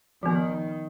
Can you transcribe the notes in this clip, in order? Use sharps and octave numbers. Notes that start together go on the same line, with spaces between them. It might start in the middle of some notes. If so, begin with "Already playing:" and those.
D#3 F3 B3